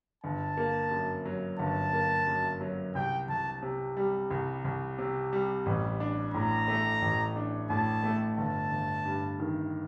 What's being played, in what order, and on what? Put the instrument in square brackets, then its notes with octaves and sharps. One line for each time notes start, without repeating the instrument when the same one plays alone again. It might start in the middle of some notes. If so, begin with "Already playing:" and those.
[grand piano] G1 [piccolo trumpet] A5
[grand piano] A#3
F#2
F#3
[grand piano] G1 [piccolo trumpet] A5
[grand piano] A#3
F#2
F#3
[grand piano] C2 [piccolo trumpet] G5
[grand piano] C2 [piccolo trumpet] A5
[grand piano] C3
G3
C2
C2
C3
G3
A1
D4
[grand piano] A2 [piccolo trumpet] A#5
[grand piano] A3
A1
D4
[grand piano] A2 [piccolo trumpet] A5
[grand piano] A3
[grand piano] G1 [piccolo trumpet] A5
[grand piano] G1
G2
D#3